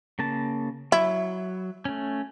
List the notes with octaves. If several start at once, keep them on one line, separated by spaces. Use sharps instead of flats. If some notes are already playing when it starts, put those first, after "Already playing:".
C#3 A#3 A5
F#3 E4
A3 C#4